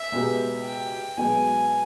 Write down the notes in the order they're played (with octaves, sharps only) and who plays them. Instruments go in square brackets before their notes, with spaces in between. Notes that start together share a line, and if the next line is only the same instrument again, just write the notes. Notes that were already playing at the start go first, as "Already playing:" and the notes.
Already playing: [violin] E5
[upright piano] C#2 B2 G#3 B3 G4
[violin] G5
[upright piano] B1 B2 G#3 B3 [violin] G#5